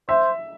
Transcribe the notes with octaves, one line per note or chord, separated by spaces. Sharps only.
C5 E5